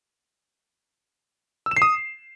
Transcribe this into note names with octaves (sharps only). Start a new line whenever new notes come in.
E6
E7
C7
D#6